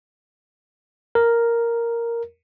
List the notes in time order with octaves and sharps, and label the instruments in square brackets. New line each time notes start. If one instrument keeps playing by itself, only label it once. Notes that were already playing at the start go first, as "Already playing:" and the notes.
[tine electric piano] A#4